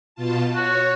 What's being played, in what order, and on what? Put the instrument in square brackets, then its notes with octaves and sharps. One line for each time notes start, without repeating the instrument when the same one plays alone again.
[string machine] B2 F4 A5
[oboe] F#4 [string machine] C#5